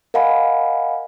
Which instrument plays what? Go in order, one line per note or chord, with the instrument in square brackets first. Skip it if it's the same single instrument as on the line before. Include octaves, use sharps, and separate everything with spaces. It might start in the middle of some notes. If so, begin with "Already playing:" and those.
[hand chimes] A#4 D#5 F5 F#5 G#5 B5